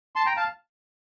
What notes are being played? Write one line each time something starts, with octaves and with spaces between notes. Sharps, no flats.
A5 C6
G5 A#5
F5 A5